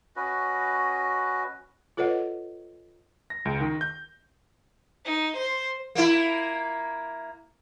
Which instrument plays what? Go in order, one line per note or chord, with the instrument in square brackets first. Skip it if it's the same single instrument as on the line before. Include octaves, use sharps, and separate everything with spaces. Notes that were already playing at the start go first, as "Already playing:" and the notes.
[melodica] C#4 F#4 B4 D#5
[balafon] F4 A4 B4 C#5 D#5 F#5
[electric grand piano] A#6
C#2
D#3
G6
[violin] D#4
C5
[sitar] A#3 E4